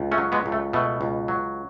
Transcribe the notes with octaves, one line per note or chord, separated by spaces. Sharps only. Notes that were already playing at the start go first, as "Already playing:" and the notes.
Already playing: C#2
A3 C#4
F#3
G#3 B3
C#2
A3
B2 A3
C#2
F#3